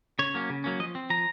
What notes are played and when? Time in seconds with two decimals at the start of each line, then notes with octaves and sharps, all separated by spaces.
0.19 C#3 C#5
0.34 F#3 A#3 C#4
0.50 C#3
0.64 F#3 A#3 C#4
0.79 F3 D#5
0.95 C4
1.10 F3 A#5